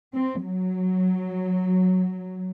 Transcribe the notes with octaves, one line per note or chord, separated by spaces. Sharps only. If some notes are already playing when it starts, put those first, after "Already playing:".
C4
F#3